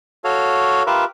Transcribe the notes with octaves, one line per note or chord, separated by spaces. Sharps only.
F#4 A4 C#5 F5
F4 G4 A#4 B4 E5